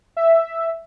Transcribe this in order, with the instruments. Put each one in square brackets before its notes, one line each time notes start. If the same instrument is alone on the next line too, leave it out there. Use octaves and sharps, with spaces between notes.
[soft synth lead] E5